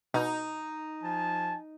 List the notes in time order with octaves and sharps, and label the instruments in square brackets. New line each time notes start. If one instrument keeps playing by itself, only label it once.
[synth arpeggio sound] B2 [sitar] D#4
[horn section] F3 G#5 A5